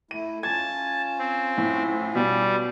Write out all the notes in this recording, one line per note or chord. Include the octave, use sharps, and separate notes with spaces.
A3 E4 D#7
C#4 F4 A5 G#6
C4
A2
B2 G3